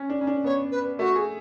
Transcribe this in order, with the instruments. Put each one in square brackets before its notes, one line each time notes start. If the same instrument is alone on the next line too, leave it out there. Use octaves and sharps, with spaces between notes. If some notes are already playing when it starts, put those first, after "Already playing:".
Already playing: [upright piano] C#4
D4
C#4
D4
[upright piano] B3 [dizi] C#5
[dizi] B4
[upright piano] A3 [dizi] F#4
[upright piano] G#4